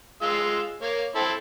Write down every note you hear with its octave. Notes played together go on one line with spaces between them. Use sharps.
G#3 F4 E6
A#3 C#5
C4 E4 A4